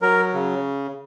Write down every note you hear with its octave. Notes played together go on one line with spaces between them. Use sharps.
F#3 A#4
C#3